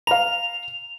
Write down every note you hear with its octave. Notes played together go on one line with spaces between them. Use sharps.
F5 A#5 F7